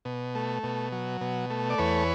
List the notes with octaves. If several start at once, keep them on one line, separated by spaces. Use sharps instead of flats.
B2
A3
B2
F#3
B2
A3
D5
E2 B4 C#5